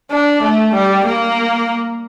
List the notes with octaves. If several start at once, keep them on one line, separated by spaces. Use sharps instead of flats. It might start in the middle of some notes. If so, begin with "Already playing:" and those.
D4
A3
G3
A#3